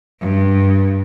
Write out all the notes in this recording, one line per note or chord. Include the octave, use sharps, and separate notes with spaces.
G2